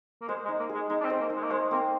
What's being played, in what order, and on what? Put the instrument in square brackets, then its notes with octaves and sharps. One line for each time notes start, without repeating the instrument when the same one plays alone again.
[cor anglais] A#3
[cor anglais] G#3 [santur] C5
[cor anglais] G#3
[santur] D#4
[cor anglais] A#3
[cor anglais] G#3 [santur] G#4
[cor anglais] G#3 [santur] D#4
[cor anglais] D4
C4
[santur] C5
[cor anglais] A#3
[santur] D#4
[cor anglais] G#3
A#3
[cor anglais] G#3 [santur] C5
[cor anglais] A#3 [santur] C4